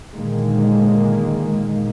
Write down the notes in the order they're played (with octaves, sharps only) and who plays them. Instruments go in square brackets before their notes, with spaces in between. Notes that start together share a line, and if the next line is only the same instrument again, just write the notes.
[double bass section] A#2 D3 D#3 G#3 A#3